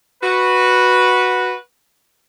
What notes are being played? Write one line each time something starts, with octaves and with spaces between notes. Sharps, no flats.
F#4 B4